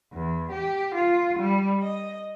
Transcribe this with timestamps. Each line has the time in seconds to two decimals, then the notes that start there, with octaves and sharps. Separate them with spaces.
0.12 E2
0.53 G4
0.95 F4
1.40 G3
1.83 D#5